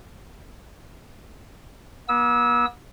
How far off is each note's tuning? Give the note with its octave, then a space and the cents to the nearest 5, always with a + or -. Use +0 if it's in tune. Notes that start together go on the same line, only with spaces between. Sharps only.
B3 -45 E6 -25